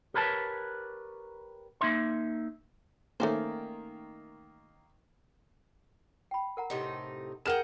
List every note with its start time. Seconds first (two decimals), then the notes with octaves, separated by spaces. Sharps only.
0.14 G4 A#4 B4 C#5 A5
1.81 A#3 D#4 E5 C6
3.20 D#3 A3 A#3 C#4 C5
6.31 G5 B5
6.57 A#4 F#5 A#5
6.70 A2 C3 D#4
7.46 G#4 A#4 F#5 G5 F6 E7